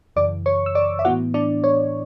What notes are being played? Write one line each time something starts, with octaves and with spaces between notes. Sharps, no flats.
F#2 C#3 E3 D5 D6
C#5 C#6
E6
D5 D6
E5
A2 E3 B3 E4 F#4 F#5
D4 D5
C#5